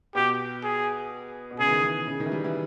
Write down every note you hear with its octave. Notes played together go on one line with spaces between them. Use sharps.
B2 G4
G#4
B2
C#3 G#4
E3
D#3
E3
C#3
D#3
E3
G3
E3